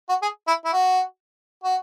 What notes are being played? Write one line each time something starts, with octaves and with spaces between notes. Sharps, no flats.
F#4
G#4
E4
E4
F#4
F#4